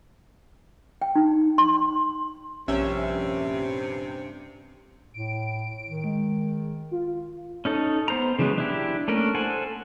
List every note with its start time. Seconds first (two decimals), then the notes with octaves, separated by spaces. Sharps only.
1.02 G5
1.16 D#4
1.58 C6
2.68 A#1 G2 C3 C#4 E5
5.14 A2 D7
5.87 D#3
6.04 G#3
6.91 F4
7.65 C#4 D#4 A4
8.08 B3 C5 A#5
8.39 C#3 E3 F#3 G#3 B3
8.58 D4 E4 G4
9.08 A3 A#3 C#4 D4 A#4
9.35 A4 C5 F#5 G#5